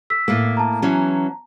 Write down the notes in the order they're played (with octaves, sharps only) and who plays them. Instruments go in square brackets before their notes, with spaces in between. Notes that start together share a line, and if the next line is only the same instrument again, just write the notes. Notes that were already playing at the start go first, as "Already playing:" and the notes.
[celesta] E6 B6
[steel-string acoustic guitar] A2 A#3
[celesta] A5 A#5
[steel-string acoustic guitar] E3 F#3 C#4